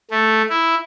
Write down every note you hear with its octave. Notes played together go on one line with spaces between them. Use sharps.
A3
E4